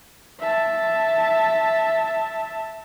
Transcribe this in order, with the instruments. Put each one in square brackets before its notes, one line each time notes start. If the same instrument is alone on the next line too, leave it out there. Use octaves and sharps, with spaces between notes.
[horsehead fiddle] E5 A5